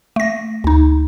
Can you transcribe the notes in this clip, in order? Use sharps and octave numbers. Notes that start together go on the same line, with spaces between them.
A3 A#6
D2 D#4